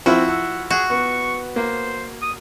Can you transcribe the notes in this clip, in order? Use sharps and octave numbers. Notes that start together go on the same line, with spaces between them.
F3 C4 E4 F#4
F#5 E6
F#4 G#4
B3 C#6
A#3 C5
D#6